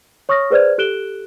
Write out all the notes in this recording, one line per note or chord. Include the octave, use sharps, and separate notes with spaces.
C#5 C#6 D#6 F6 A#6
G#4 B4 C5 D5 F6 G#6
G4 A4 F#6 D7 E7 G7